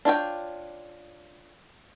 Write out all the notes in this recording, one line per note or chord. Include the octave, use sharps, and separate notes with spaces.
D4 F4 C#5 G5